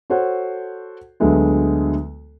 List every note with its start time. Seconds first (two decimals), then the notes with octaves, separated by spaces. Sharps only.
0.10 F#4 A4 C5 C#5 F#5
1.20 D2 D3 F#3 G#3 A3 B3